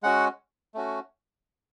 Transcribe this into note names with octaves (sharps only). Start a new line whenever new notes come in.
G#3 C#4 F#4 F#5
A3 C#4 F#4